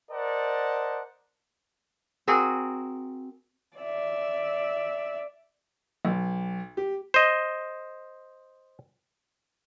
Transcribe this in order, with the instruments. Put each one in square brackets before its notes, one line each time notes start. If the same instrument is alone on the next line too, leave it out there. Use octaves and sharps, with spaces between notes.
[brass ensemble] A#4 C5 D5 D#5 F#5 A5
[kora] C4 F#4 G#4 A#4
[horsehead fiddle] D5 E5
[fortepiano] B1
G4
[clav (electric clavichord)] C5 D#5